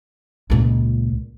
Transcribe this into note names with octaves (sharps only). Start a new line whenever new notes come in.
C#2 A#2